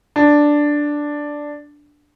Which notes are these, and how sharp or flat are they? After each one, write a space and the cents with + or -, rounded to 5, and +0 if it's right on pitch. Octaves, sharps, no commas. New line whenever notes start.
D4 +0